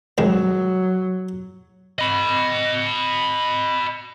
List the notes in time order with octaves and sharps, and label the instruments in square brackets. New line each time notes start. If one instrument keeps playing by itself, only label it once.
[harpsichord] C2 D#3 G#3 [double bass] F#3
[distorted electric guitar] D#5 B5